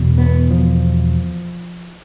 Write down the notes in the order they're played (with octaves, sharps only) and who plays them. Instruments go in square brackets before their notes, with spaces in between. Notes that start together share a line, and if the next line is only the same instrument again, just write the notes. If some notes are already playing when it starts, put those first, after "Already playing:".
Already playing: [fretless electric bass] E2 B2
B3
F3